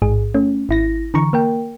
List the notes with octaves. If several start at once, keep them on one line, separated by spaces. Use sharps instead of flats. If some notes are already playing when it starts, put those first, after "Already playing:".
A1 G#2 G#4
A3 C#4
G#1 E4 A#6
D3 E3 A#5 C#6
A#3 A#4 G5